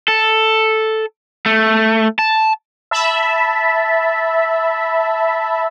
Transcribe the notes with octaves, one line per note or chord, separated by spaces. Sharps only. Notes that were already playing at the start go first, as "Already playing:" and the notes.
A4
A3
A5
E5 A5 B5